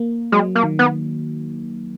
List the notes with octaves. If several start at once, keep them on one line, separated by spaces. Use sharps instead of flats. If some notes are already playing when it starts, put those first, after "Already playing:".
Already playing: A#3
F#3 G#3
A#3
D#3
B3